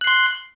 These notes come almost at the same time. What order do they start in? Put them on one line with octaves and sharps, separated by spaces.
F#6 C7 C6